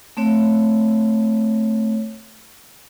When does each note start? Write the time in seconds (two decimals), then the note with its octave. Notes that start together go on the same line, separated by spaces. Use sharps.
0.17 A3 C4 C#5